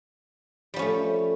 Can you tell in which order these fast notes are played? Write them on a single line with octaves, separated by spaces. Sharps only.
G3 F3 C#4 A3